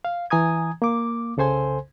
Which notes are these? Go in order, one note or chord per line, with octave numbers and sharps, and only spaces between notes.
F5
E3 G#5 A#5 D#6 G#6
A#3 D6
C2 C#3 A4 C5 G#5 C6